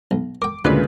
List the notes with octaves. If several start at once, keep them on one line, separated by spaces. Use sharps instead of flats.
B1
A#4 G5 D6
D2 A#2 C#3 G#3 D#4 F4 B4 D5